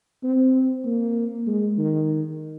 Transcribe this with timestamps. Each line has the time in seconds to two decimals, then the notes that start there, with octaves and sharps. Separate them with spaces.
0.23 C4
0.85 A#3
1.47 G#3
1.78 D#3